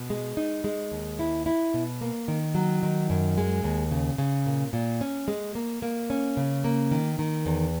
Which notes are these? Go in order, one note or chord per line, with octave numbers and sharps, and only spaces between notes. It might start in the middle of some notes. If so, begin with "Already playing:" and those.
Already playing: B2
G#3
D#4
G#3
D#2
E4
E4
B2
A#3
D#3
F#3
D#3
F#2
G#3
D#2
C#3
C#3
A#2
A#2
C#4
G#3
A#3
A#3
C#4
C#3
A#3
D#3
D#3
E2